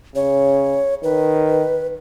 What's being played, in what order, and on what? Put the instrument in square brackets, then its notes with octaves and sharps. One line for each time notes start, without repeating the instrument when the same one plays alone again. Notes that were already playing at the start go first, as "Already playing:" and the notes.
[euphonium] C#3 [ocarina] C#5
[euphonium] D#3 [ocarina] B4